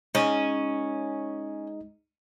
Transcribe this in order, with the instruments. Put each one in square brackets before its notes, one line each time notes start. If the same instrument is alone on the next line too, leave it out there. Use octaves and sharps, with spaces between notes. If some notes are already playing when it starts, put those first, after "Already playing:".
[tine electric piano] G#3 D#4 D#5 [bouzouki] C#4